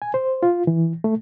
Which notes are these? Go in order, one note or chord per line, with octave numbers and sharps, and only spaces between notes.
G#5
C5
F4
E3
A3